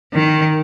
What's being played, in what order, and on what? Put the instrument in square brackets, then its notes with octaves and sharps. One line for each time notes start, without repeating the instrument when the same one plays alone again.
[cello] D#3